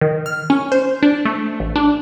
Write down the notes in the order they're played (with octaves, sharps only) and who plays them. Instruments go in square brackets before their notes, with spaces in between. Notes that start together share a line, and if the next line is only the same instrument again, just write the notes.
[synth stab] D#3
F6
C#4
C5
D4
A3
A1
D4